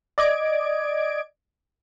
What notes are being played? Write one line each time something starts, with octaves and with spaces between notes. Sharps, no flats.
D5 D#5 G#6 D7